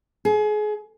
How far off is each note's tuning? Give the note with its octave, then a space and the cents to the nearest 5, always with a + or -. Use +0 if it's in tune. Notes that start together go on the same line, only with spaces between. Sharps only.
G#4 +30